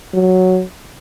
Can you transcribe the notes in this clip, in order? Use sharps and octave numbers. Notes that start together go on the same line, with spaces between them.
F#3